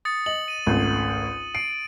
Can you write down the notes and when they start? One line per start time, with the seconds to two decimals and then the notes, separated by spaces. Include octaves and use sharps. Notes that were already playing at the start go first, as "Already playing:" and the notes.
0.05 D#6 A6 C#7
0.26 D#5 F#7
0.48 D#7
0.66 G#1 C#2 A3
1.55 C7 D7